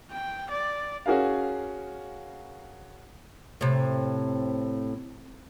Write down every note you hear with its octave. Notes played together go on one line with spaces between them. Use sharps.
G5
D5
C#4 F#4 G#4 A#4 F5
A2 C3